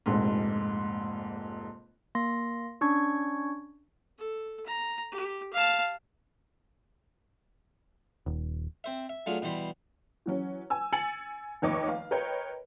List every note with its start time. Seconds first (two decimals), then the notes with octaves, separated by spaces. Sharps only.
0.06 F1 A#1 G#2
2.15 A#3 C6 A#6
2.81 C#4 D4 C#6 G#6
4.18 A4
4.66 A#5
5.12 G4
5.53 F5 A5
8.26 D#1
8.84 C4 C5 E5
9.09 E5
9.26 F#3 A3 D4 F4 G#4
9.42 B2 E3 G3 C5 B5 C6
10.26 E3 F#3 C#4
10.70 G#5 E6
10.92 G#5 E6 A6 C#7 F#7
11.62 F1 D#2 C#5 D#5 C#6 D6
11.88 F5
12.11 A#4 B4 C#5 D#5 G5